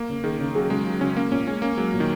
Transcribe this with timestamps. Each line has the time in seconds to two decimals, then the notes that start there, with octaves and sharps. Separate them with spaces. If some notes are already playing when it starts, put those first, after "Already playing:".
Already playing: A#3
0.09 C#3
0.24 D#3 G#4
0.39 C#3
0.55 F#3 G#4
0.70 C#3 G#3
0.86 F#3
1.01 C#3 C#4
1.16 A#3 C#4
1.32 A#2 C#4
1.47 G#3 C#4
1.62 A#3 C#4
1.77 F#3 G#3
1.93 A#2
2.00 D#3